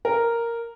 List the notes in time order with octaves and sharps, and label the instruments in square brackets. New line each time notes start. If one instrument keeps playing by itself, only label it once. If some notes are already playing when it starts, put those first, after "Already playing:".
[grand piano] A#4